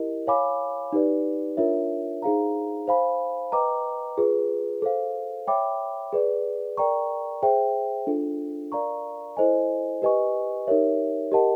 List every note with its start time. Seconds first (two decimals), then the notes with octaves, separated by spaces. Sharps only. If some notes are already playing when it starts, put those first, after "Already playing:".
Already playing: E4 G4 A#4 D#5
0.27 C#5 F5 G#5 B5 D6
0.93 D#4 G4 B4 D5
1.57 D4 F4 A#4 C#5 E5
2.22 D#4 G#4 C5 F5 A#5
2.87 C5 F5 G#5 B5
3.52 B4 D#5 G5 A#5 D6
4.18 F4 G#4 B4
4.82 A4 C5 F5
5.47 C#5 E5 G5 B5 D6
6.13 G#4 B4 D5
6.77 A#4 D5 G5 A#5 C#6
7.43 G#4 C5 E5 G5
8.07 D4 F4 A4
8.72 A#4 D5 F5 A#5 C#6
9.37 E4 A4 C5 D#5 G#5
10.02 G4 B4 D#5 G#5 C#6
10.67 D#4 G4 A#4 C#5 E5
11.32 G4 A#4 D#5 F#5 A5